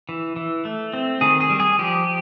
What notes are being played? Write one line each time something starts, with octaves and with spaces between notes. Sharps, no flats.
E3
E3
A3
C4
D#3 G#4
G#4
G3
G#4
F3 G4